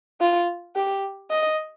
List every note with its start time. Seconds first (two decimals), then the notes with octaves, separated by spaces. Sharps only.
0.21 F4
0.76 G4
1.30 D#5